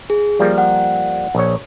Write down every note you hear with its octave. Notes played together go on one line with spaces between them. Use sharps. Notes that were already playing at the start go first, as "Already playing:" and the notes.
G#4
F3 G3 A#3
F#5
A#1 C#5